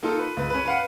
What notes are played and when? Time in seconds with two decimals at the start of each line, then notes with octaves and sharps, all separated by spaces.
0.03 A#3 D#4 F4 A4
0.19 B4
0.37 C#2 B4
0.50 C#4 B4
0.65 B4 F5 F#5